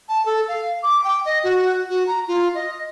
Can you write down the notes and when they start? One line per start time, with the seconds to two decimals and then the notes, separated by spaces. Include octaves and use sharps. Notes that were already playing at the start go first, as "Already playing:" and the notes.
0.09 A5
0.25 A4
0.48 F5
0.83 D6
1.04 G5
1.25 D#5
1.44 F#4
1.89 F#4
2.07 A#5
2.28 F4
2.55 D#5